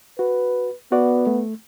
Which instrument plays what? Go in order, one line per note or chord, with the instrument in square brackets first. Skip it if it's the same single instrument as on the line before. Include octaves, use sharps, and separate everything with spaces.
[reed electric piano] F#4 [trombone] B4
[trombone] B3 [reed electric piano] F#4 D5
[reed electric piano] A3